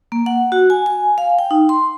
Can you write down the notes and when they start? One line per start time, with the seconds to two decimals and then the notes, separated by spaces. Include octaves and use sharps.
0.12 A#3
0.26 F#5
0.52 F#4
0.70 G#5
0.86 G#5
1.18 F5
1.39 G5
1.51 D#4
1.69 C6